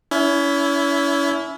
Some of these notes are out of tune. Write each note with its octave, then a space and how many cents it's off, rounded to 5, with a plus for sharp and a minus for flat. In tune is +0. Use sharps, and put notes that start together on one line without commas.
C#4 +35 E4 +0